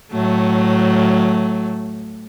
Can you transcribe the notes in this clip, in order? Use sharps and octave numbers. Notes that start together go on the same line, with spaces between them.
A2 F#3 A3